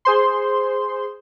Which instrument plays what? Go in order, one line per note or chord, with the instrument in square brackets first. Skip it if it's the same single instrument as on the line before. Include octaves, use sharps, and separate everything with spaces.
[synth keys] G#4 C5 C6